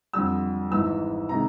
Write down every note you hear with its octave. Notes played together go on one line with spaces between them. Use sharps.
F2 D3 G3 E6
G#1 G#2 E3 E6
C3 D#3 G#3 A#5